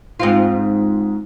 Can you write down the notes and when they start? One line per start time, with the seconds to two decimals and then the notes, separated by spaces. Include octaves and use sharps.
0.20 G#2 C4 F4